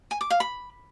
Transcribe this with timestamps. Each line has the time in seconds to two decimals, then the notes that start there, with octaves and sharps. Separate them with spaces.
0.11 G#5
0.21 D6
0.30 F5
0.40 B5